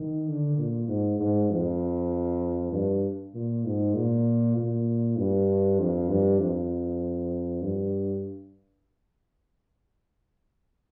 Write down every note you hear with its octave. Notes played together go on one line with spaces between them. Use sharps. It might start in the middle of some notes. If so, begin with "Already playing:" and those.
Already playing: D#3
D3
A#2
G#2
G#2
F2
G2
A#2
G#2
A#2
A#2
G2
F2
G2
F2
G2